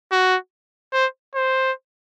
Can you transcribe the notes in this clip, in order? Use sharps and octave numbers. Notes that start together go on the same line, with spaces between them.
F#4
C5
C5